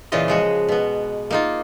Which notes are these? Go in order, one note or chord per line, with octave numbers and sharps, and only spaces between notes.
A#2 C#3 E3 F4 D#5
F3 G#3 F#4
B2 B3
A#3 D#4 F4